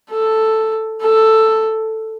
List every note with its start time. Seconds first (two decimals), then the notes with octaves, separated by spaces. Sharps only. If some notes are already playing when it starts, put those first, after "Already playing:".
0.11 A4
1.01 A4